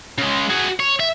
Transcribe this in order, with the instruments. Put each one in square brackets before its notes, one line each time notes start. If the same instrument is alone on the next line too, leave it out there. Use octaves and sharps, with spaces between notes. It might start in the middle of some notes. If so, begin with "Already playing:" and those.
[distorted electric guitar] C#3 G#3
F#4 G#4
C#5
E5